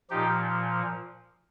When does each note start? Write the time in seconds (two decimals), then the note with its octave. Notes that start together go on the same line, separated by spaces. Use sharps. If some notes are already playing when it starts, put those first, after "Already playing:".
0.10 A#2 F3 D#4 G4